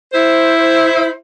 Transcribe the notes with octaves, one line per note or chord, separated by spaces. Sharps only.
E4 C5